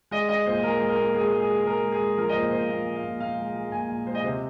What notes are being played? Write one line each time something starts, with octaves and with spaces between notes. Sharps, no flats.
G#3 D#5
G#3 D#5
A#2 C5
G#3 A#4
G#3
A#4
A#2
G#3 G#4
G#3
G#4
G#3
G#3 A#4
G#3
G#4
G#3
F3 A#4
D#5
A#2 C5
A#2 C5
A#2 F5
G#3
F5
A#2
A#2 F5
G#3
G#3
A#2 G#5
A#2
G#3 C5
D#5
C3 C5